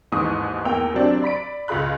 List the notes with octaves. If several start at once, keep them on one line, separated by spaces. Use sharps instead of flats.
A1 D#2 G#2 E3 D#6
E2 A#3 G5 E6 F7
C3 F#3 C4 D4
D5 B5 B6 D7
C#2 F4 G#4 B5 F#6